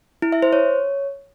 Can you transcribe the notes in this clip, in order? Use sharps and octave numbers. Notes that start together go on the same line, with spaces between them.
E4
E5
C5
C#5